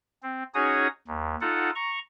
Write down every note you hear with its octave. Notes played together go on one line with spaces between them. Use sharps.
C4
C#4 D#4 F#4 G#4 C#5 D#6
D#2
D#4 F4 A4 F#5
A#5 C#6